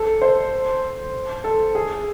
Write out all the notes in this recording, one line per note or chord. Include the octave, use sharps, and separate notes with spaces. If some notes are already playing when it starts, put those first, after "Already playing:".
Already playing: A4
C5
A4
G#4